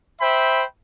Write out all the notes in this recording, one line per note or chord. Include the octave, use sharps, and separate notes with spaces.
C5 E5 G5 B5